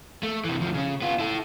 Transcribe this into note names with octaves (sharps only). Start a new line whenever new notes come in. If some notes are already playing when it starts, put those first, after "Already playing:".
A3
C3 E3
D2 F3
C#3 C#4
B3 F4
E4 A4